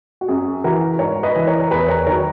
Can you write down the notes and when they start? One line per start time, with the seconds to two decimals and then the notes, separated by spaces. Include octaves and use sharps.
0.21 F#4
0.28 F#2 G#4
0.64 E3 F#4 A#4
0.99 G#2 A#4 C#5
1.23 B4 D#5
1.36 E3
1.47 A#4 C#5
1.60 A#4
1.71 E2 G#4 B4
1.88 A#4 C#5
2.06 D#3 F#3 A#4 C#5